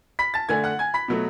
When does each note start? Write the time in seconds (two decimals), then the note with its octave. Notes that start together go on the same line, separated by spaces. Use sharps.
0.19 B5 B6
0.34 A5 A6
0.49 D3 A3 G#5 G#6
0.64 F#5 F#6
0.79 G#5 G#6
0.94 B5 B6
1.08 B2 F#3 A3